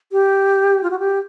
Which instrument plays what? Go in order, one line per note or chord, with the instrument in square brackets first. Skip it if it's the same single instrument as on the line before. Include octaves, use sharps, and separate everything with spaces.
[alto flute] G4
F4
F#4
G4